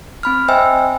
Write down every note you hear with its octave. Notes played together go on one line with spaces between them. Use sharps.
C4 B5 F6
C5 D#5 E5 G5 G#5 E6